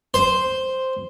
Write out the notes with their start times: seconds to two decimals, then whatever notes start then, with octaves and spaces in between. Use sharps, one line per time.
0.14 C5